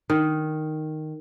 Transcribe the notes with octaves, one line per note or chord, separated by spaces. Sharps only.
D#3